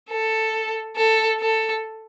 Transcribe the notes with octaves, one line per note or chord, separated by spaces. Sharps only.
A4
A4
A4